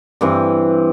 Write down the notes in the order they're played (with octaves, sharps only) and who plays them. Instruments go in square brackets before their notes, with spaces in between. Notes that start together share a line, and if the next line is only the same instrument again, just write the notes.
[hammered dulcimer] G2 E3 C4